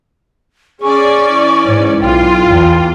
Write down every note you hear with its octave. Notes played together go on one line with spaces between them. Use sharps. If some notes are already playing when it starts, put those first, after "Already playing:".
C#4 G#4 D5 C#6
E3
G#2 C#5
B1 F4 G5
E2